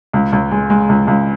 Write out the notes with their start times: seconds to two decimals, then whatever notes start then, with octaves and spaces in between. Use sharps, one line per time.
0.13 C#2
0.32 C#2
0.51 G#3
0.70 G#3
0.89 C#2
1.07 C#2